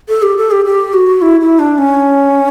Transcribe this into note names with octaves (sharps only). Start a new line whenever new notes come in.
A4
G4
A4
G4
G4
F#4
E4
E4
D4
C#4